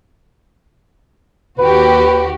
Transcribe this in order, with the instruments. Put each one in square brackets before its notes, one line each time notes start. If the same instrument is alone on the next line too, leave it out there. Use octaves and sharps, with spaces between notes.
[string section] D#2 F#4 G4 [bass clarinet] B4